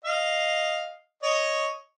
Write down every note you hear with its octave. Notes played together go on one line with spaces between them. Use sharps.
D#5 F5
C#5 D#5